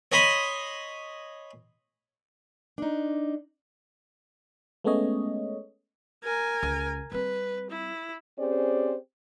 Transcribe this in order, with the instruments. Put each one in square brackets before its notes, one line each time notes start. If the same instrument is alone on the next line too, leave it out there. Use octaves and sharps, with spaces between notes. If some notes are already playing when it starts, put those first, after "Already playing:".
[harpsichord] C#5 D#5 G#5 B5 C6
[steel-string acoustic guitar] D4 D#4
[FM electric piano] G#3 A3 B3 C#4 C#5 D#5
[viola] A#4 G#5
[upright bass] C#2
[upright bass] G3 C4 [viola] B4
[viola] E4
[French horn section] C4 C#4 G4 G#4 C5 D5